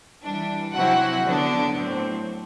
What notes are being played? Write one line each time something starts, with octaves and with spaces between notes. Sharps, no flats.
E3 G3 D4
C3 F#3 C4 E4 F#4 F#5
D3 F#3 B3 D4
A2 F#3 C4